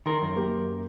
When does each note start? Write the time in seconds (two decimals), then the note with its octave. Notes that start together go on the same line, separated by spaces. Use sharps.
0.06 D#3 A#4 C6
0.22 F#2
0.36 A#3 G4